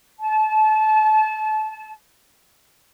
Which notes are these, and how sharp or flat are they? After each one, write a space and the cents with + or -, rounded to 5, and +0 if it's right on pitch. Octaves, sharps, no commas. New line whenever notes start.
A5 -30